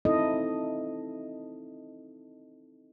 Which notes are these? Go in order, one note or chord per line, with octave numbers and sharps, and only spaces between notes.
C4 D#4 E4 A4 D#5